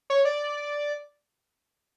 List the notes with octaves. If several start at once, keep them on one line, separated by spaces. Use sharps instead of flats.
C#5
D5